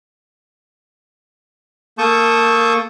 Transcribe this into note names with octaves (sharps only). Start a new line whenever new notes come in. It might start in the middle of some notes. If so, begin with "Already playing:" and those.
A#3 A4 A5 C#6 D#6 G6